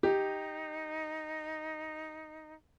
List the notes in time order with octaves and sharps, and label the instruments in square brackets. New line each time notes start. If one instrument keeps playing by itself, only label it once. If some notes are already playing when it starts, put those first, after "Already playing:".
[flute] D#4 [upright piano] G4